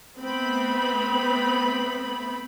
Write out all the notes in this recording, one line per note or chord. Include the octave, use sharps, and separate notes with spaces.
A3 B3 C4 B5